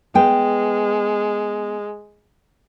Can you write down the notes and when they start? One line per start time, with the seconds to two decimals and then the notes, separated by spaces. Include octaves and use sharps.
0.15 G#3 B3 G5